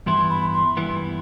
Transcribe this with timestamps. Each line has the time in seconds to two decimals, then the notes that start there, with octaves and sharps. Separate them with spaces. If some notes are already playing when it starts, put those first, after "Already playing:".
0.06 G2 E3 B3 E4 C6
0.30 B5
0.53 C6
0.77 G2 E3 B3 E4